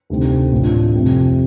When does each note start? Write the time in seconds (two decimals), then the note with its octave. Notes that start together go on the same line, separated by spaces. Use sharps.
0.10 D2 C3 D#3 G3 C4
0.52 A1 A2 A3 D4 F4
0.93 F2 C3 G3 C4